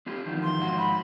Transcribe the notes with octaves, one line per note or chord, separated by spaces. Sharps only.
C4 F4 G4
E2 D#3 F3
C6
G#2 F3 F#4
B5